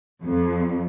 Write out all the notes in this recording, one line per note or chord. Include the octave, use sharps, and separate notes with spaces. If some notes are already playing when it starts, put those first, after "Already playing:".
F2